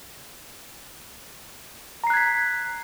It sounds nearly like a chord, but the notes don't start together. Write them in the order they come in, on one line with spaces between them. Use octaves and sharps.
A#5 C7 F#6 G#6 B6